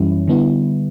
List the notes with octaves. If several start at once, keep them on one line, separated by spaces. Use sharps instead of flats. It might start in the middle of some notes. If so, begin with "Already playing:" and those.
Already playing: F#2 E3 G3 C#4 E4
D3 G3 B3 E4